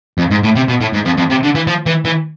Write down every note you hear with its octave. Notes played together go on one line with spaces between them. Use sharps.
F2
G#2
A2
C3
B2
A2
G#2
F2
F2
C3
D3
E3
F3
E3
E3